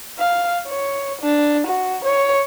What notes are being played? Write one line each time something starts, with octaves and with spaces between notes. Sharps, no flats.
F5
C#5
D4
F#4
C#5